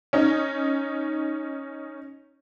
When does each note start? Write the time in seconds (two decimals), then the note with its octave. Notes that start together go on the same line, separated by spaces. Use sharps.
0.13 C#4 D#4